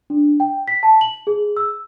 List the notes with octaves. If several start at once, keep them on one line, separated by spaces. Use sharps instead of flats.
D4
G5
B6
A5
F#7
G#4
E6